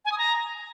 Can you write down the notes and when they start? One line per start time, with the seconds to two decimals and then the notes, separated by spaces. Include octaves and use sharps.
0.05 G#5
0.12 D#6
0.18 A#5